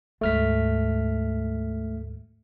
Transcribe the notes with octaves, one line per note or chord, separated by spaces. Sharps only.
D2 G#2 A3 F6 B6